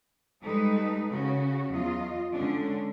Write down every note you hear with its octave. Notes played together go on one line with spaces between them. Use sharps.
G3 G#3 D#4 A4 B4
C#3 C#4 F#4
E2 F#3 F4 D#5
D3 G#3 C#4 D4